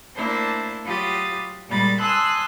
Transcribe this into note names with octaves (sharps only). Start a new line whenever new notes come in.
A3 A#3 D4 E4 C5 A5
F#3 F4 G4 B5 D#6 A6
A#2 G3 G#3 B5 A6
G#5 A5 C6 D#6 E6 F#6